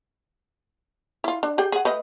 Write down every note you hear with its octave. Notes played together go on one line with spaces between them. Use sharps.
E4 F4
D4
G4 G#4 G5
G#4 F#5
A3 B4 D#5